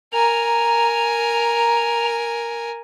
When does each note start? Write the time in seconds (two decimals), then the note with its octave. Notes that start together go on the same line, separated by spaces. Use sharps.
0.13 A#4 G#5 A#5